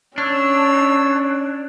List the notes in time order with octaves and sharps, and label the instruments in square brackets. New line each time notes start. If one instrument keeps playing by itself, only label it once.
[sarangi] C#4 [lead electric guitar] D4 [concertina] C#5 [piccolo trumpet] E6